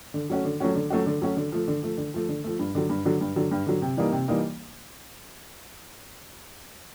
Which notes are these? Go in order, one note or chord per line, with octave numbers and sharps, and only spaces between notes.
D3
F#3 A3 C#4 F#4
D3
F#3 A3 C#4 F#4
D3
F#3 A3 C#4 F#4
D3
F#3 A3 C#4 F#4
D3
F3 A3
D3
F3 A3
D3
F3 A3
D3
F3 A3
G2
D3 F#3
G2
D3 F#3
G2
D3 F#3
G2
D3 F#3
C3
E3 G3 A#3 D#4
C3
E3 G3 A#3 D#4